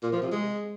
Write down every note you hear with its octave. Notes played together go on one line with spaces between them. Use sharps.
A#2
F3
C3
G#3